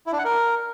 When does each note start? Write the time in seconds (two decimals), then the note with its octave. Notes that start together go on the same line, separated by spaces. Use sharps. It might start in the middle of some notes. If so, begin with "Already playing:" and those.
0.06 E4
0.13 D4
0.19 F#5
0.25 A#4